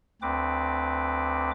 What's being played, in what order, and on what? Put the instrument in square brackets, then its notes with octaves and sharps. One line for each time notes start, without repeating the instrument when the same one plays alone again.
[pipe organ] D2 C4 B4 D6